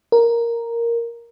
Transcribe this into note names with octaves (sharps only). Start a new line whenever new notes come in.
A#4